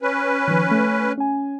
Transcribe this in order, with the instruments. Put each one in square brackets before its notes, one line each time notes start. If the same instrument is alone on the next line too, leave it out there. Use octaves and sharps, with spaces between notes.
[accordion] C#4 B4
[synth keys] D#3 F3
A3
C#4 G#5